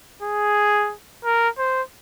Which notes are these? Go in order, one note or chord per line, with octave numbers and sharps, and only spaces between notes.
G#4
A#4
C5